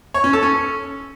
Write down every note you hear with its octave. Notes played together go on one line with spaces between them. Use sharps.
C#5
C#4
A4
C#4